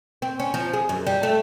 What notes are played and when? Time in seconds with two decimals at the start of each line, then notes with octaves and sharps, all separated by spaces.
0.22 C4
0.40 C#4
0.54 F3
0.74 G#4
0.89 F#2
1.07 G3
1.23 A3